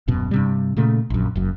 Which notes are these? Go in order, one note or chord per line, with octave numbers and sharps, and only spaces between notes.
D#1 F#2 B2
G2 C3 G3
A#2 C#3 A3
A#1 F#2
F#1 F#2